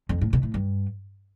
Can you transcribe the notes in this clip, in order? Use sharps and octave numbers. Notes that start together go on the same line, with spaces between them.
F2
A2
B2
A2
G2